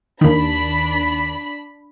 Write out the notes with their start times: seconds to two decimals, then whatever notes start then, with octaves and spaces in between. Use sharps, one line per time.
0.21 D#2 D#3 D4 B5